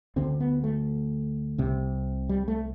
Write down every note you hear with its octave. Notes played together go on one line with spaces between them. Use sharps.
D2 D3 C4
B3
A3
C2 C3
G3
A3